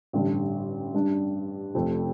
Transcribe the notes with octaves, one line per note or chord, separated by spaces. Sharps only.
A1 G2 D3 G3 D4
G2 G3 D4
F1 F2 C3 F3 A3